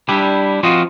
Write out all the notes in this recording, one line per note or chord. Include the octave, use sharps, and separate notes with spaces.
G3 D4 E4 G4
F3 C4 F4 F#4 D#5